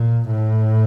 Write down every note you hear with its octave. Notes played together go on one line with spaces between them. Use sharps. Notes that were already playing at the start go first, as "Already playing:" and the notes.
Already playing: A#2
A2